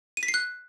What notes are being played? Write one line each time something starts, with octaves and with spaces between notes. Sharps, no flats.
D#7
B6
C7
F#6